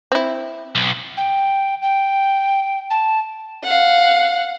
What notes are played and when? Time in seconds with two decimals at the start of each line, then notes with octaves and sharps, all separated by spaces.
0.12 C4 E4
0.75 B1
1.17 G5
1.82 G5
2.90 A5
3.63 F5 F#5